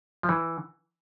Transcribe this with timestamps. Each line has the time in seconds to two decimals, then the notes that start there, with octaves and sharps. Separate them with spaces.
0.23 F3
0.29 E3